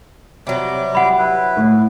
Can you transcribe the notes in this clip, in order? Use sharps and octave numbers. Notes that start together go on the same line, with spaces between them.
C3 F#3 G3 D6
F#5 B5
E4 B4
A2